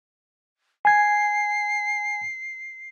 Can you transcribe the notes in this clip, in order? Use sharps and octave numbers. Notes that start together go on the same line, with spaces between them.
G#5 G#6 C7